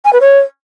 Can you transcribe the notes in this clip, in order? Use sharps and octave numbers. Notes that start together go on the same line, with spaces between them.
G#5
B4
C#5